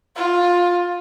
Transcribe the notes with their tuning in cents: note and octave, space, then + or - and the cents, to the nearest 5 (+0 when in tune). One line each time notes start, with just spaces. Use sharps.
F4 +15